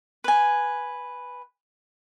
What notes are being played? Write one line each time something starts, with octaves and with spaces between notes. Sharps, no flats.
B4 G#5